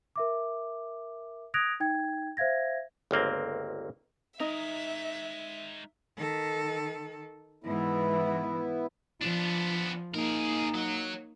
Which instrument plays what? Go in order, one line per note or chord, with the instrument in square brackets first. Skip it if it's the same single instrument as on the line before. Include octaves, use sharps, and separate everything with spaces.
[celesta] A#4 E5 D6
D#6 F#6 G#6 A#6 D7 F7
D#4 G5 G#6
C5 E5 F5 G#6 A#6
[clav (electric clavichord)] G1 C#2 A#3 C4
[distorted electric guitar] G#3 A#4 [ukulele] D#4 D#5 [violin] E5
[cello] D#3 A4
[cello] G#2 E3 [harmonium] B3 E4
[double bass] F3 [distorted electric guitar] B3 D4
[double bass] A#3 D#4 [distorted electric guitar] G#4 A#4
[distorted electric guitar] F#3